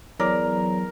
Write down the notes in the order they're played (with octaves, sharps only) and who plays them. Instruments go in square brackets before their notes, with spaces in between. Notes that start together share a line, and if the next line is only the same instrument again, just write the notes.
[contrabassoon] E2 [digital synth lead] F#3 [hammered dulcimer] A#4 [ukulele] D5